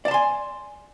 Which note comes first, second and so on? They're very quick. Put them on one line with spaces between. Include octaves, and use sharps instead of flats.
D5 A5 C6 G#5